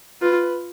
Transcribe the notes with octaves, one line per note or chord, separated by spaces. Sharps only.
F4 B4